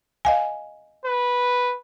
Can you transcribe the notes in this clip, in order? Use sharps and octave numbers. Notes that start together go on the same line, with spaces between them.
D#5 F5 G#5
B4